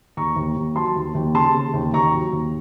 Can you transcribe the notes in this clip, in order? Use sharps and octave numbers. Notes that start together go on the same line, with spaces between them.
D#2 A#5 C#6
D#2
D#2
F#3 A5 C6
D#2
D#2
C#3 A5 C6
C#3
D#2
D#2 A#5 C#6
F#3
D#2